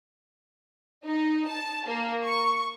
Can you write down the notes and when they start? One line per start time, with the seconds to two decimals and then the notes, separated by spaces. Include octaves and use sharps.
1.04 D#4
1.47 A5
1.86 A#3
2.24 C#6